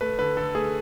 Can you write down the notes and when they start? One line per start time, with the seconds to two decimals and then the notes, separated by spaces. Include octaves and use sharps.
0.01 A3 B4
0.19 D3 B4
0.37 D3 A4
0.54 A3 G#4